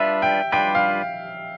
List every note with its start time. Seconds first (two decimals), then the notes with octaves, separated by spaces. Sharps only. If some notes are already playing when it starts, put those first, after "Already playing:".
Already playing: G3 D4 F4 B4 E5
0.22 G5
0.52 G3 D4 F4 B4 G5
0.75 F5